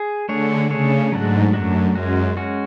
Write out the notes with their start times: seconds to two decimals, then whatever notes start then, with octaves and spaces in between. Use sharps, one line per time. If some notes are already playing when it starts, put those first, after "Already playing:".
Already playing: G#4
0.29 D3 A3 D4 G#4 C#5
0.70 C#3 A3 D4 G#4 C#5
1.12 G#2 F#3 A3 D4 F#4
1.54 F#2 F#3 A3 D4 F#4
1.95 F#2 G#3 C#4 F#4
2.37 G#3 C#4 F#4